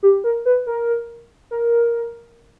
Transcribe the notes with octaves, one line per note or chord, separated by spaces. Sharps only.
G4
A#4
B4
A#4
A#4